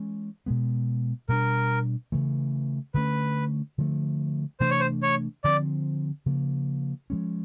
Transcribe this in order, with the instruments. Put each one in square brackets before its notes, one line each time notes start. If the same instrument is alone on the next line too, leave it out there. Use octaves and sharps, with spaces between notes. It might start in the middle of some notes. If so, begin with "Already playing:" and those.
Already playing: [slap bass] E3 G#3 C#4
B2 G#3 B3
[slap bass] B2 G3 A#3 D4 [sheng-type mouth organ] A#4
[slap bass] C#3 E3 A3
[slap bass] D3 F3 A3 C#4 [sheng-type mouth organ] B4
[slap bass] D3 F3 A3
[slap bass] C3 E3 A3 D4 [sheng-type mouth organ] C5
[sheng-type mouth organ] C#5
C5
C#5
[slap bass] D3 F3 A3 C4 [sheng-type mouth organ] D5
[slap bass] C#3 F3 A#3
F3 G#3 C#4